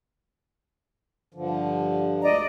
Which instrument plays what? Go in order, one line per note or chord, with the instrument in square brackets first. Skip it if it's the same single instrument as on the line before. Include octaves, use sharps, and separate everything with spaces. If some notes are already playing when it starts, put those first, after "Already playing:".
[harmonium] G2 D3 F3
[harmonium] D2 G#3 A#5 [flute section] D5 D#5